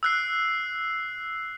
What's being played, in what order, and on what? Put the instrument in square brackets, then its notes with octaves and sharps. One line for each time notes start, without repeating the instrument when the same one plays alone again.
[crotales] E6 F#6 C7